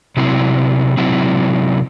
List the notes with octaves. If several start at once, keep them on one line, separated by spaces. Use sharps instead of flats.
C3 F#3 C4 E4
C3 F#3 C4 E4